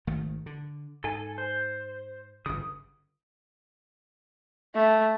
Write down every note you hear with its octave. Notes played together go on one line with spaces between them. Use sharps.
G#1 D#3 A3
D3
G#2 A4 G#5
C5
G1 C#3 D#6
A3